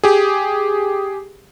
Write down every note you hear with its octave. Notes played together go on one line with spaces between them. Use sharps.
G4 G#4